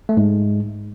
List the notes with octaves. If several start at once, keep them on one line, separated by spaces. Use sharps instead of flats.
A3
G#2 G#3